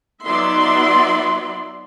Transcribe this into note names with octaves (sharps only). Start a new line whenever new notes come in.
F#3 B3 D#4 D5 E5 C6